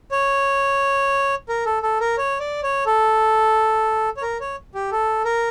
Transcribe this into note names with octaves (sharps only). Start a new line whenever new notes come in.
C#5
A#4
A4
A4
A#4
C#5
D5
C#5
A4
C#5
A#4
C#5
G4
A4
A#4